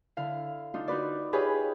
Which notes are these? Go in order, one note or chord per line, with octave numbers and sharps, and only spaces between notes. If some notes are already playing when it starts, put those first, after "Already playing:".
D3 E4 F5
D4 D#4 F4
D#4 F#4 B4 D5
F4 G4 G#4 B4 C#5 D#5